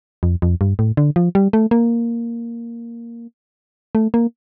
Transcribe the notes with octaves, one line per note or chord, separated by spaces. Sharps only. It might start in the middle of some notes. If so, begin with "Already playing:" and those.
F2
F2
G2
A2
D3
F3
G3
A3
A#3
A3
A#3